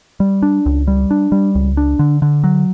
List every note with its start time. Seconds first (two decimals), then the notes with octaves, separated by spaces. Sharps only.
0.20 G3
0.43 D4
0.66 C#2
0.87 G3
1.11 D4
1.32 G3
1.55 C#2
1.77 D4
1.99 D3
2.22 D3
2.44 F#3